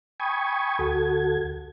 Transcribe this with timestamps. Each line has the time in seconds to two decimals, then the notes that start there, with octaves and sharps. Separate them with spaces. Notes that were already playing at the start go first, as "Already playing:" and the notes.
0.20 G5 G#5 B5 C#6 D#6 G#6
0.79 D2 F#4 A4 G#6